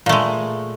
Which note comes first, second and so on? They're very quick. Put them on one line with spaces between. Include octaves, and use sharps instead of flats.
A#2 A3 G#3